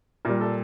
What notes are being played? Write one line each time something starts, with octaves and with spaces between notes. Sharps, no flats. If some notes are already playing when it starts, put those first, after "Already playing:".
A#2 G3 A#4
A4